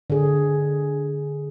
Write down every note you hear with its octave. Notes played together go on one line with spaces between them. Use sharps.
D3 G#4